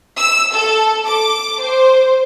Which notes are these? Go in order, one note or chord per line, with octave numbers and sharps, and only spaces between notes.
E6
A4
D6
C5